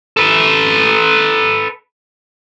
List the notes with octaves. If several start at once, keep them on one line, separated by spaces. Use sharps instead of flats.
A4 B4